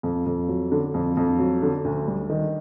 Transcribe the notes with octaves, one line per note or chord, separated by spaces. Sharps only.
F2
F2
F#3
D3
F2
F2
F#3
D3
D2
G3
D#3